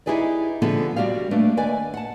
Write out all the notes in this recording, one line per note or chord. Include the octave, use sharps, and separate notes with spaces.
D#4 E4 G4 G#4 B4 D5
D3 F3 B3 F4 G#4 A4
G3 F#4 G4 D5 F5
A3 A#3 D4 B4
D#2 B4 D5 G#5
F#5 A5